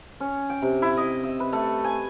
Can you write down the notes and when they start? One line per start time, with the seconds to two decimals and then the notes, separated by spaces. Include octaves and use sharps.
0.20 C#4
0.50 G5
0.62 C3
0.82 E4
0.97 D#5
1.24 E5
1.40 B4
1.53 A3
1.84 G#5